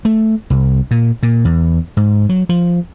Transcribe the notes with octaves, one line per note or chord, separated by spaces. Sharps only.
A3
C2
A#2
A#2
E2
G#2
F#3
F3